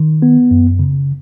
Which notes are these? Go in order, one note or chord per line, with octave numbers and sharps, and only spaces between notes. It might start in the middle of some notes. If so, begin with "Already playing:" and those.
Already playing: D#3
B3
F#2
C#3